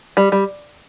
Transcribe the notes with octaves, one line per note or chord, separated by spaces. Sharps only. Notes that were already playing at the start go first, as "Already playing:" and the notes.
G3
G3